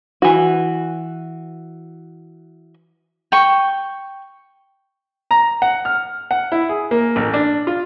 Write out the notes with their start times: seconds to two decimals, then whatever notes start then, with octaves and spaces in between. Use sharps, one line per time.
0.22 E3 F#4
3.32 G5 C#6
5.31 A#5
5.62 F#5
5.85 F6
6.31 F#5
6.52 E4
6.69 G#4
6.91 A#3
7.16 A1
7.34 D4
7.67 F4